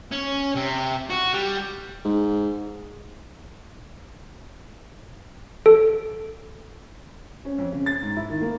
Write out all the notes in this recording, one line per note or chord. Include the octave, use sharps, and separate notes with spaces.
C#4
C3
F#4
G3
G#2
A4
C#4
F2
C#3
A6
G#2
E4
D#3
A#3